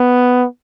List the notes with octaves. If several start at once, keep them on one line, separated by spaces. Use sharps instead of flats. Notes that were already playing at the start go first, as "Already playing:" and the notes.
Already playing: B3